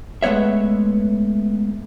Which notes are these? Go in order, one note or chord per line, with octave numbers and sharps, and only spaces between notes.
G#3 A3 B3 C#5 E5